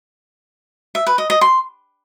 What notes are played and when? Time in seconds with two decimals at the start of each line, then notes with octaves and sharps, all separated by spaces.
0.95 E5
1.07 B4
1.18 D#5
1.30 D#5
1.41 C6